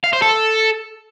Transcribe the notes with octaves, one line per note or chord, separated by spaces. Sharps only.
F5
C5
A4